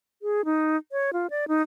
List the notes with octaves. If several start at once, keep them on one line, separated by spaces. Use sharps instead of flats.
G#4
D#4
C#5
F4
D5
D#4